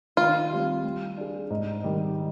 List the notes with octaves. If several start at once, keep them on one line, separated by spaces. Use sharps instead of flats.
D#3 F4
G3 C4 G4
G3
D4 G#4
G#2
D#3 G3